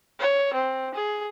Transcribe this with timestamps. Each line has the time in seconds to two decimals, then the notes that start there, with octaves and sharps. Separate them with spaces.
0.19 C#5
0.54 C4
0.95 G#4